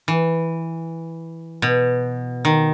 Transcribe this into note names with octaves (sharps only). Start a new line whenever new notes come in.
E3
B2
D#3